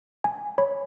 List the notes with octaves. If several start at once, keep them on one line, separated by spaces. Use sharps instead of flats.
G#5
C#5 B5